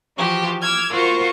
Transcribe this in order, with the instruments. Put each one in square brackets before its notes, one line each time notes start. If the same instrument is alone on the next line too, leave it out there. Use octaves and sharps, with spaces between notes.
[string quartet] E3 F3 F#4 G4
D6 E6 F6 G#6
F4 F#4 A#4 C5 C#6